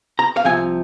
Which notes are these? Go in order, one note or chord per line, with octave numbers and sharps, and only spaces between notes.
A#5
F5
C2 C3 F3 G#5